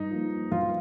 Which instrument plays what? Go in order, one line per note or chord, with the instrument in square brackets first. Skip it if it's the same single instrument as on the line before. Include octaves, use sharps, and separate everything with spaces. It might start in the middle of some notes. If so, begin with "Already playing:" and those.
Already playing: [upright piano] G2 [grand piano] D#4
[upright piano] F3 A#3
[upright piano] G2 [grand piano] F4